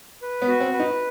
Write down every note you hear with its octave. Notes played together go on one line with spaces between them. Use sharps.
B4
B3
F#4
C4
B4
D#4